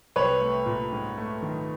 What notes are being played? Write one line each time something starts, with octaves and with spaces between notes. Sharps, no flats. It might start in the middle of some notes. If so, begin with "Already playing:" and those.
C2 B4 C#5
A3
A#2
G#2
A3
D#3